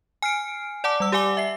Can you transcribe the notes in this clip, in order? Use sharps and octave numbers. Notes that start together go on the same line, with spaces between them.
G#5 F6 C7 D7
D5 F#5 A5 D6
G3 E6
G4 D5 F#5 G#5 D6 G7
E5 C7